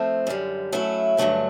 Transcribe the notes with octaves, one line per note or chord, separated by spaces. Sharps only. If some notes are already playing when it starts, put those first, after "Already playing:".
Already playing: A2 F3 A3 C4
F#2 D3 G3
F#3 A3 C#4 E4
G2 D3 F#3 A3 C#4